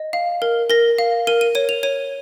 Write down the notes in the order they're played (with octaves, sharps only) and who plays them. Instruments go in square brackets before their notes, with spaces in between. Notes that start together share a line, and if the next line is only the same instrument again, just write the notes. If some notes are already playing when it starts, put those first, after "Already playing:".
Already playing: [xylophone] D#5
F5
A#4
A#4 A#6
F5
A#4 D#7
D#7
C#5 D#7
F7
C#5 D#7